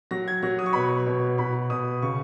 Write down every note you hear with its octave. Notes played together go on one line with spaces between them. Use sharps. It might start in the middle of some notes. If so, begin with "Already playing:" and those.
F#3 A#6
G#6
F#3 A#6
D#6
C#6
B2 B5
C#6
B2
B2 B5
B2 D#6
C#3 C#6